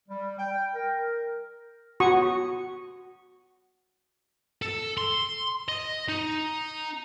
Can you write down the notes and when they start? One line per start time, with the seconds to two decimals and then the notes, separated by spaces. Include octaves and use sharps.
0.09 G3
0.39 G5
0.75 A#4
2.00 F#4 C#6 D#6
4.62 A4
4.98 C6
5.69 D#5
6.08 D#4